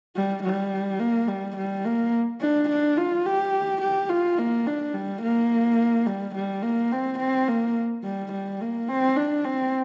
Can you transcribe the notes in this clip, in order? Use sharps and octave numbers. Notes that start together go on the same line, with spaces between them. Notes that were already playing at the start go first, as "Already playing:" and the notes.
G3
G3
A#3
G3
G3
A#3
D4
D4
F4
G4
G4
F4
A#3
D4
G3
A#3
G3
G3
A#3
C4
C4
A#3
G3
G3
A#3
C4
D4
C4